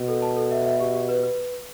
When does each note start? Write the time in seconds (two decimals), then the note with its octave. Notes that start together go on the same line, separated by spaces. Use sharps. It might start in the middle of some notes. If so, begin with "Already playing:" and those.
Already playing: B2
0.08 A4
0.22 A5
0.37 A4
0.51 E5
0.66 E5
0.80 G4
0.94 G4
1.09 B4
1.23 B4